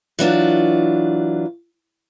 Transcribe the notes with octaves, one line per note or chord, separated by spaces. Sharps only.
E3 F#3 D4 F4